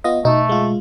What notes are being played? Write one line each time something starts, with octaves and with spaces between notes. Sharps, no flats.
B3 F4 D#5
B2 A3 D#4
G#3 F4